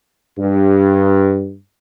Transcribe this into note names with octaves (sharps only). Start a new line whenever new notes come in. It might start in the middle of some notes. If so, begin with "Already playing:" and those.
G2